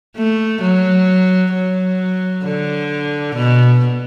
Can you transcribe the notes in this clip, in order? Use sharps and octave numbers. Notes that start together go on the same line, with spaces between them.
A3
F#3
F#3
D3
B2